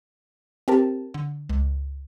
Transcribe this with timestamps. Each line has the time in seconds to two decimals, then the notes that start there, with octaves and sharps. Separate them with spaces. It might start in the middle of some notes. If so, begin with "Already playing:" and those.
0.68 C4 G4 A#4 A5
1.14 D3
1.49 C#2